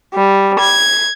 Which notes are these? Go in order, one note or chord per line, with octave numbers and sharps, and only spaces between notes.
G3
G#6